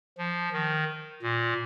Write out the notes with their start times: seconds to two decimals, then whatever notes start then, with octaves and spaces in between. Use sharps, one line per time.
0.18 F3
0.53 D#3
1.22 A#2